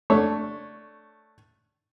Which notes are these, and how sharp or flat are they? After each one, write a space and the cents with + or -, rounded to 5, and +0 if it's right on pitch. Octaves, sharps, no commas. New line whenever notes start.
A3 +0 D4 +0 C#5 +0